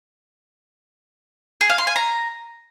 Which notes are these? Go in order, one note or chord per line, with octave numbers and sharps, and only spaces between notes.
G#4
F5
C6
G#5
A#5